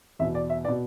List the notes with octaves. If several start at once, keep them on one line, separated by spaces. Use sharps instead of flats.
E2 B2 E5
D5
E5
D5
B2